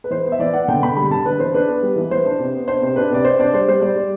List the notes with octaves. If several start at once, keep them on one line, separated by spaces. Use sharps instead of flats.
B4
E3 C5
B3
E5
E3 D5
B3 F#5
D3 G5
D3 B5
G3 B5
D3 A5
D4 B4
E3 C5
D4 B4
B3
G3
E3
E3 C5
D4
C3
B3
D4 C5
C3
D4 B4
C3 D5
C3 C5
D4 D5
G3 C5
G3 C5
G3 D5
G3